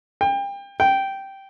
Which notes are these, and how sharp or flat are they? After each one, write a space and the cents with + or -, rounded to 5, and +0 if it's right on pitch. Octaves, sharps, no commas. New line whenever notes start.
G5 +30
G5 -10